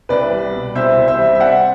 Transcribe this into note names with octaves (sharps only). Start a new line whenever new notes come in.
C2 B4 D5
G3
B2
C2 C5 E5
C2
C5 E5
G3
E5
C4 D5 F#5